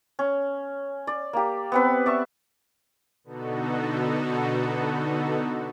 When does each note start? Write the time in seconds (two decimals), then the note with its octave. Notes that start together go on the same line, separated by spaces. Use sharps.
0.19 C#4
1.07 D5
1.33 A#3 G4
1.72 B3 C4 B4
2.06 D5 E5 C#6
3.24 B2 D3 B3 D#4 F#4 A4